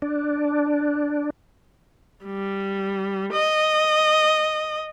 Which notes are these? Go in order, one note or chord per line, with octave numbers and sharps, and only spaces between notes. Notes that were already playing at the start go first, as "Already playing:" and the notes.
D4
G3
D#5